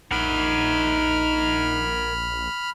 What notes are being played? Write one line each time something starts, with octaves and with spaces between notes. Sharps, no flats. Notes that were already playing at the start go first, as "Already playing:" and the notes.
A#1 D#4 A#4 F#5 B5 F6